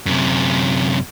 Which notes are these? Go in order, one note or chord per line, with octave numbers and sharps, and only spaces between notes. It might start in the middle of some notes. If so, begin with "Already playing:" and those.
F#2 C3